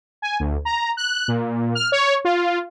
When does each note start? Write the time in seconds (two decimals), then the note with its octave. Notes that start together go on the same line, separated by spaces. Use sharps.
0.22 G#5
0.40 D2
0.65 A#5
0.97 F#6
1.28 A#2
1.75 F6
1.92 C#5
2.25 F4